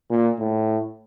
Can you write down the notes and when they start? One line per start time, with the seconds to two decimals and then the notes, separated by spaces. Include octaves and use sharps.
0.10 A#2
0.39 A2